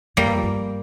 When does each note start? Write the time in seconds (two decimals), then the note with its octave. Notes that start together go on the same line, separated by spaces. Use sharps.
0.17 F2 G3 A#3
0.26 G2
0.35 F2
0.43 G2